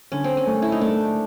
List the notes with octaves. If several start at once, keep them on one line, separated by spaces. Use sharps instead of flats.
D3 C#4
C4
C#4
A3
E4
D#4
A3 D4